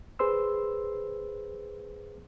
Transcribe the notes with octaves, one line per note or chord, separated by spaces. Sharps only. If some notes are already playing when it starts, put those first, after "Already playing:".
G#4 B4 C5 C6 E6